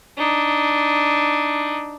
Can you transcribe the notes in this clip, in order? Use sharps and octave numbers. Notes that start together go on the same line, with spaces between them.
D4 D#4